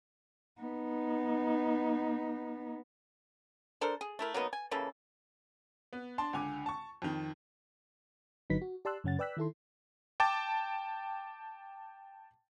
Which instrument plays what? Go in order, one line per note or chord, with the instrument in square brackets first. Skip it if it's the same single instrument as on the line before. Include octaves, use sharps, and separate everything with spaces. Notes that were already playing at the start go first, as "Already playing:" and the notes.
[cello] B3 D#4
[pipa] D4 A4 A#4 C5
G#4
A3 E4 A#4
F#3 A#3 B3 D#4
G#5
C#3 E3 A#3 A4
[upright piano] B3
D4 A5 C6
C#2 D3 G#5 D6
A5 C#6
F2 D#3
[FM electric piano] G1 D3 F#3 D#4 B4 B6
F#4
G4 D5 A5 C6 E6 F#6
F#2 C#3 C#4 F#5 A6
B4 D5 G5 E6 F#6 B6
D#3 E4 A4 C6
[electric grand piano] G5 A5 D6 A6